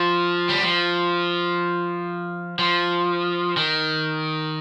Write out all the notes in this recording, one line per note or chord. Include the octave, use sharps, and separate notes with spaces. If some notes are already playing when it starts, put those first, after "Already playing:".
Already playing: F3
G3
F3
F3
D#3